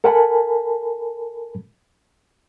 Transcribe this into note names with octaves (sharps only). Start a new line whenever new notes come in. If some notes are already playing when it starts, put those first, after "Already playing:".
A4 A#4 F#5 G#5 A5 B5